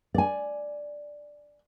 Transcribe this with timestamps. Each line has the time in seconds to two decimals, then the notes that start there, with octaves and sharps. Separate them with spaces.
0.14 D5 G#5